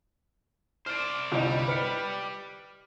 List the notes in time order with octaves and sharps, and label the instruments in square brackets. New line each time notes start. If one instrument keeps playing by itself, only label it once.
[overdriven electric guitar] C5 D5 [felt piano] F6 D7
[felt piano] G1 C2 D#5 [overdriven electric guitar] G3
[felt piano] B4 F6 C#7